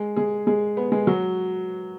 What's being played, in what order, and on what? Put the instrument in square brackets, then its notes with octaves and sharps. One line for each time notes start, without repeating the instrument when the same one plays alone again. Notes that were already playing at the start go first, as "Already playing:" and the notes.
Already playing: [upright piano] G#3 G#4
G#3 G#4
G#3 G#4
B3 B4
G#3 G#4
F#3 F#4